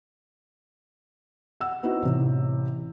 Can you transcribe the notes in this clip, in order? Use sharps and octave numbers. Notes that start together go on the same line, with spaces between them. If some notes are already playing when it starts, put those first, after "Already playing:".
F#5 E6
B3 C4 D#4 E4 F#4
A1 C3